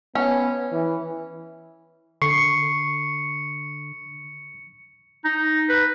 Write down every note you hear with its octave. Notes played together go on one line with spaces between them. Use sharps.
B3 C#4
E3
D3 C#6 C7 C#7
D#4
B4